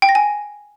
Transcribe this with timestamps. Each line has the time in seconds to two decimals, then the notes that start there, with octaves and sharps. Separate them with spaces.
0.02 G5
0.09 A#6
0.15 G#5